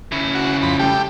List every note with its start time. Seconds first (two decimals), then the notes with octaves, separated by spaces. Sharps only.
0.12 C#3 E4
0.35 F#4
0.63 F2 B5
0.79 G3 A3 G4